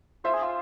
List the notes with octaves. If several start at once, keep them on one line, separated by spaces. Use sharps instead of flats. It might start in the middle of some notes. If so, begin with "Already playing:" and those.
F4 C5 E5
G#4
F4